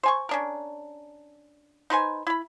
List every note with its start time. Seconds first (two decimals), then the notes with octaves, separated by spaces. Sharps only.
0.03 C5 G#5 C#6
0.29 C#4 D4 A#4
1.90 D#4 B4 C5 G#5
2.27 E4 B5